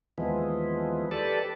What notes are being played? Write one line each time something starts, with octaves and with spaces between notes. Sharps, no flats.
D#2 E3 F3 G#3 B3
G4 A4 B4 D5 A5